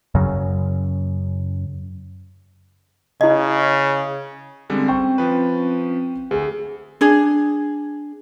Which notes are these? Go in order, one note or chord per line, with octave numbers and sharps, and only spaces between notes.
F#2 C#3
C#3 E4 D#5
D3 G3 G#3 C4 C#4
C5 G5 C#6
F3 B4
D2 G#4
D4 G#4